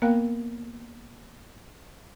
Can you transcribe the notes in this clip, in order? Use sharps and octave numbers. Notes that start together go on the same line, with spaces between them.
A#3 B3 A#4 F5 G5 F#6